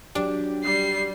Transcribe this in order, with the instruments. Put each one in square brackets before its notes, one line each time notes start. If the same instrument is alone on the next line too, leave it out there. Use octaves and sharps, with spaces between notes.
[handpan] F#3 G4 [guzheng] D4
[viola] G3 [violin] C7